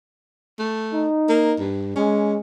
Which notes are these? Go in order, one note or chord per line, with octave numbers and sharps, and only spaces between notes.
A3
D#4
A#3
G2
G#3 C#4